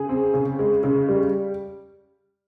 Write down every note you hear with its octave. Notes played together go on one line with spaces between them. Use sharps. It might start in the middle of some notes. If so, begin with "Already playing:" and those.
Already playing: C#3 G#4
C4
C#3
G#3
C#3
G3